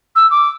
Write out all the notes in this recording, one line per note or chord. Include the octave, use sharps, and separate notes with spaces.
E6
D6